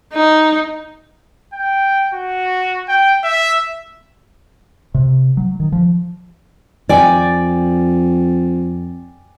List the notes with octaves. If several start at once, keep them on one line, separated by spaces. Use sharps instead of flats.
D#4
G5
F#4
G5
E5
C3
F#3
D#3
F3
F2 D5 G5 G#5